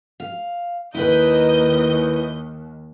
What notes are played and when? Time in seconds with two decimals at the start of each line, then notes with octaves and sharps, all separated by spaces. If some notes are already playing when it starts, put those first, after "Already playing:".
0.20 F5
0.95 D#2 E4 B4 D#5 G6